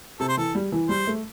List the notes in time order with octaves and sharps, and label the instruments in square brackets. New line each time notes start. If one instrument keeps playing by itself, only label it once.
[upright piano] C3 [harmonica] A4
[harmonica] C5
[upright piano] E3 [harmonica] A4
[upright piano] G3
E3
[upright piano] G3 [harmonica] C5
[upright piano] A3